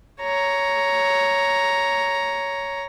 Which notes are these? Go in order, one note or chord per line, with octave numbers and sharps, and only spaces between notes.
C#5 A#5